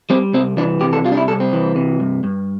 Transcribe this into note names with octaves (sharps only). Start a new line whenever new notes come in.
G3 C4
C2 C4
E3 D4
C3 G4
A4
G3 F4
D4
E4
C2 A4
C4
E3
C3
G2
G2